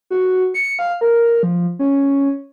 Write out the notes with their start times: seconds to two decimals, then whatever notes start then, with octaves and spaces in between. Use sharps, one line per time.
0.11 F#4
0.54 C#7
0.79 F5
1.01 A#4
1.43 F3
1.79 C#4